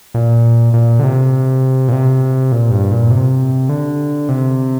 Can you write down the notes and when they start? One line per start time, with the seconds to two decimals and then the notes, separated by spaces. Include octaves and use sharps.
0.14 A#2
0.73 A#2
0.99 D3
1.03 C3
1.88 A#2
1.93 C3
2.52 A#2
2.71 G2
2.91 A#2
3.11 C3
3.69 D3
4.29 C3